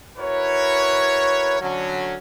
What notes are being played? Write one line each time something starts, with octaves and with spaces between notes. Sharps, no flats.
E4 F#4 A#4 B4 C#5
D3 F#3 C#4